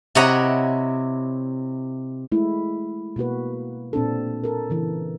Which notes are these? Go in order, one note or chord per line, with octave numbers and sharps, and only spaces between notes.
C3 E4 C#5 D#5 F#5 A#5
G#3 A3 E4
B2 A#3 F#4 B4
A#2 C4 D4 A4
A4 A#4
C#3 E3 A4